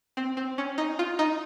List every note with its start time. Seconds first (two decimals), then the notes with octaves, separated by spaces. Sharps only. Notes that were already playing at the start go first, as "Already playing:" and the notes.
0.17 C4
0.37 C4
0.58 C#4
0.78 D#4
0.99 F4
1.19 D#4